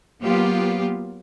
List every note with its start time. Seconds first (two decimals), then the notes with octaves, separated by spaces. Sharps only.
0.20 F#3 A#3 B3 F4 G4